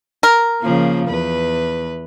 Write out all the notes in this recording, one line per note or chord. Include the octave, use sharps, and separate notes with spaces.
A#4
C#3 F3 A#3
E2 B4